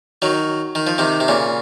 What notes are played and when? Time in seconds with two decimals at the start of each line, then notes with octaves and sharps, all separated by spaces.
0.22 D#3 F#3
0.75 D#3
0.87 F3
0.98 C3 D#3
1.20 C3
1.28 A#2 C#3